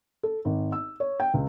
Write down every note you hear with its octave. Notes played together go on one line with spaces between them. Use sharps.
A4
G#1
E6
C#5
G5
C#2